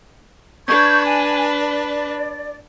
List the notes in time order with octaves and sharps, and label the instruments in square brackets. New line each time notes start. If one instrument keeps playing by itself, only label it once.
[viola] D4 B4 [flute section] C#6 G6 G#6
[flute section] G#5
D5